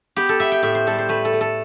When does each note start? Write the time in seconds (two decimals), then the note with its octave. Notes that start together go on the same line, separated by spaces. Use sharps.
0.16 B3 G4
0.29 A4
0.40 B3 E5
0.52 G5
0.63 A2 E5
0.75 C5
0.87 G3 A4
0.98 C5
1.09 A3 B4
1.25 A4
1.33 A3
1.41 A4